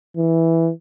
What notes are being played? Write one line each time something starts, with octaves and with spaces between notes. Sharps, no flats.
E3